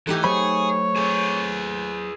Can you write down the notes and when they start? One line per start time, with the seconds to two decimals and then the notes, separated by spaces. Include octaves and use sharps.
0.07 E3 A3 D#4 G4
0.24 F#3 G#4 C5 C#5 B5
0.96 G#4 B4